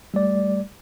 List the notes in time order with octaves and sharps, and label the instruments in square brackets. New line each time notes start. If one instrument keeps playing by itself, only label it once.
[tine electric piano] G3 A3 D5